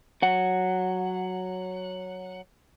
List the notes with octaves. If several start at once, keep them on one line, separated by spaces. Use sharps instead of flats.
F#3 F#5